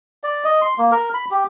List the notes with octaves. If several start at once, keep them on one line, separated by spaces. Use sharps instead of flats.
D5
D#5
C6
A#3
A#4
B5
G4